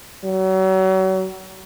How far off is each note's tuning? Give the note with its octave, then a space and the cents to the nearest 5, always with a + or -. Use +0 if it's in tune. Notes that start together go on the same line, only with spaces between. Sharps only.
F#3 +35